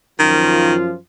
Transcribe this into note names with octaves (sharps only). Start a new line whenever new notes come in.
F#2 D#3 F3 F4